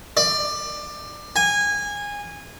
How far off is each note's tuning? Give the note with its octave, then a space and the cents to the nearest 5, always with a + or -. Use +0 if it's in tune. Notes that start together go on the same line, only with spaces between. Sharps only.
D5 +20
G#5 -20